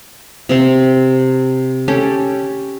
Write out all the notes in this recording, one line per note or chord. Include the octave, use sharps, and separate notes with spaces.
C3 C4 C6
C#4 G4 A4